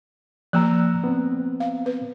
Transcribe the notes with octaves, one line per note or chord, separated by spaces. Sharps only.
F3 A#3 A#5 E6 F#6
B3 C4
F5
B4